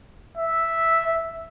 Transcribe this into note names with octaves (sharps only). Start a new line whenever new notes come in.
E5